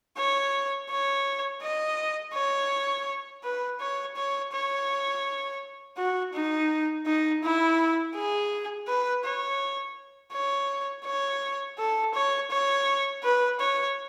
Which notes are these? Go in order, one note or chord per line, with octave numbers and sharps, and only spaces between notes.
C#5
C#5
D#5
C#5
B4
C#5
C#5
C#5
F#4
D#4
D#4
E4
G#4
B4
C#5
C#5
C#5
A4
C#5
C#5
B4
C#5